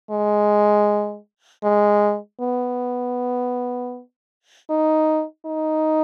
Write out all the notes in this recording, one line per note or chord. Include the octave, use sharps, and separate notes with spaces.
G#3
G#3
B3
D#4
D#4